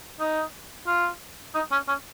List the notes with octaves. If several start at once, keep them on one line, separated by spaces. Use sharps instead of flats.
D#4
F4
D#4
C#4
C#4